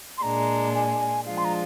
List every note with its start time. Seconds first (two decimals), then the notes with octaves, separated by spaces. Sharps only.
0.18 C6
0.22 A#2 G#3 D4 A#5
0.74 G#5
1.25 F3 G#3 D4 F4 F5
1.38 C6
1.45 A#5